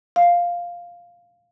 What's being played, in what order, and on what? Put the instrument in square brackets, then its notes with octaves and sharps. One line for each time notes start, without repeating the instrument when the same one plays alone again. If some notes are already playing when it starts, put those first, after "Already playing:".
[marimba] F5